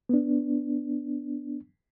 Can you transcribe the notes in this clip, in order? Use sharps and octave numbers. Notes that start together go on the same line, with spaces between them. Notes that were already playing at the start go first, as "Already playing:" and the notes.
B3 D4